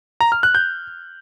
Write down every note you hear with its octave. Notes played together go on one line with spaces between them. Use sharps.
A#5
F6
F#6
G6